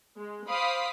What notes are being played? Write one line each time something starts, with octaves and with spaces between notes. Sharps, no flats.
G#3
C5 F5 B5 D6 D#6 B6